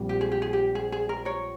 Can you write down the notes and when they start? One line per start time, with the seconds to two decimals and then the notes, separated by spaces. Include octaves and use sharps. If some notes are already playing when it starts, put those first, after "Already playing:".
Already playing: A#1 A#2 G3 C4
0.09 G4
0.21 G#4
0.32 G4
0.42 G#4
0.53 G4
0.75 G#4
0.92 G#4
1.09 A#4
1.25 A#4 C#5